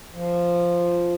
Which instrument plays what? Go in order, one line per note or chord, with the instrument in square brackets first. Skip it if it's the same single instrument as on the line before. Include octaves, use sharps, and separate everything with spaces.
[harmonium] F3